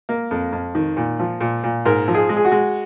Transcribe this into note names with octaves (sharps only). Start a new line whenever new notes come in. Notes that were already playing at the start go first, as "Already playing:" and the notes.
A#3
F2
F2
D#3
A#2
F3
A#2
A#2
G#2 A#4
F3
G#4
G#3
G#4
F#4
G#3